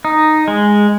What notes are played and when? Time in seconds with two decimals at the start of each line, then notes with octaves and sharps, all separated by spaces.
0.05 D#4
0.48 G#3